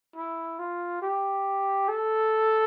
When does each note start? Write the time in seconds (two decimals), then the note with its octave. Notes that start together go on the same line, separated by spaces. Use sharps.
0.16 E4
0.59 F4
1.02 G4
1.89 A4